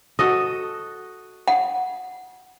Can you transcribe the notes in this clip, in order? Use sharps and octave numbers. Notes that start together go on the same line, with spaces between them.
F#4 A4 D#5 D#6
F#5